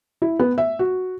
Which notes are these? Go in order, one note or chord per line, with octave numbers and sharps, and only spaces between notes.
E4
B3
E5
F#4